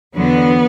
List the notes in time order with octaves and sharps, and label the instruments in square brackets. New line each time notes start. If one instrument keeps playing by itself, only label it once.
[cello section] E2 D3 F#3 B3